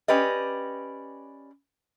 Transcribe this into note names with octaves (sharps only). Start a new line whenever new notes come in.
C#4 G4 B4 D5 D#5